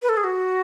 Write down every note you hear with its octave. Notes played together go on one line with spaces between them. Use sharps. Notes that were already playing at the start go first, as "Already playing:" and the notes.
B4
A4
G#4
F#4